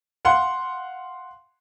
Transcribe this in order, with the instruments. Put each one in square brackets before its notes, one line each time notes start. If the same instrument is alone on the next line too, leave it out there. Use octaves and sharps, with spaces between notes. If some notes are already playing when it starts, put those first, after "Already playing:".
[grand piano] F5 F#5 C6